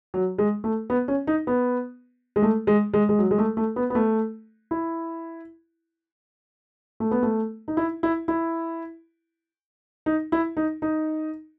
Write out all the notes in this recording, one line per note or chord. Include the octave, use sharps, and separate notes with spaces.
F#3
G#3
A3
B3
C#4
D#4
B3
G#3
A3
G#3
G#3
G#3
F#3
G#3
A3
A3
B3
B3
A3
E4
A3
B3
A3
D#4
E4
E4
E4
D#4
E4
D#4
D#4